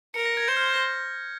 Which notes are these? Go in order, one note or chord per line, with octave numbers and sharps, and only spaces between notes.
A#4 C#7
A#6
G#6
C5 G6
F6
A#6